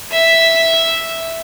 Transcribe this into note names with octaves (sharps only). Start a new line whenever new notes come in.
E5